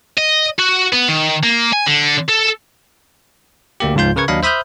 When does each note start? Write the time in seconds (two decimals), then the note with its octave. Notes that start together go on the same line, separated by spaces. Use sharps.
0.17 D#5
0.59 F#4
0.93 B3
1.09 D#3
1.43 A#3
1.73 G#5
1.87 D3
2.29 A4
3.80 D2 A#3 G4
3.95 C#2 G#2 F3 F4 C6 G6
4.16 C#3 A#4 B4 C#6 G#6
4.28 D#2 F#3 D4 D#5 F5 B5
4.43 C5 E5 B5 D#6 F6 G6